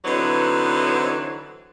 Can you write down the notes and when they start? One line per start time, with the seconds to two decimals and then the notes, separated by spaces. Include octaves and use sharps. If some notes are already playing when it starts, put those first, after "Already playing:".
0.05 D3 E3 F#3 B3 C4 D#4